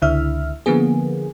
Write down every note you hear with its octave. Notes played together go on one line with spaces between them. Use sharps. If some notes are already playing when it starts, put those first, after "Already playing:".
C#2 D3 E4 E5 F6
D3 F3 A#3 B3 G#4